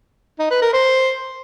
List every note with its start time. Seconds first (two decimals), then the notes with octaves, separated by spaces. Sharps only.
0.39 D#4
0.51 B4
0.62 A#4
0.73 C5